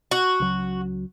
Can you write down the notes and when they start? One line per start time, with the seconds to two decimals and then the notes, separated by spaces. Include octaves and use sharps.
0.11 F#4
0.40 C#2 F#3